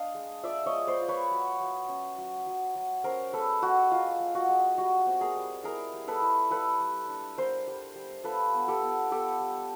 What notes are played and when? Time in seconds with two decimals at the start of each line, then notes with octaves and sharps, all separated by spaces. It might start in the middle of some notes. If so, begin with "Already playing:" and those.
Already playing: D4 D#5 F5
0.15 G#3
0.43 F4 D5 E5
0.66 C#5 D#5
0.72 G#3
0.87 C5 D5
1.01 F4
1.08 B4 C#5
1.31 F#3
1.60 F#3
1.89 C#4
2.18 F#3
2.47 F#3
2.75 F#3
3.04 C#4 A#4 C5
3.33 G#3 A4 B4
3.62 G#3 F#4
3.91 G#3 F4
4.20 G#3
4.35 F#4
4.49 G#3
4.78 G3 F#4
5.06 C4
5.21 G#4 A#4
5.36 G3
5.64 E4 G#4 A#4
5.93 G3
6.08 A4 B4
6.22 E4
6.51 G3 A4 B4
6.80 G3
7.08 D4
7.37 G3 A#4 C5
7.67 G3
7.95 G3
8.24 F4 A4 B4
8.53 B3
8.68 G4 A4
8.82 B3
9.11 B3 G4 A4
9.40 G3